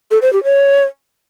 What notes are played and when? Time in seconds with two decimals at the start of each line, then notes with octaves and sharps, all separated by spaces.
0.11 A4
0.22 C5
0.33 G4
0.44 C#5